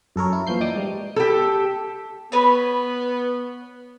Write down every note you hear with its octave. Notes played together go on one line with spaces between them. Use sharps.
F#2 A4 A#4 C#5
E4
A#2 E3 F3 G6 C7
D#4 D5 G5 D6 D#6
G#2 G3
G4 A4
B3 B4 C#5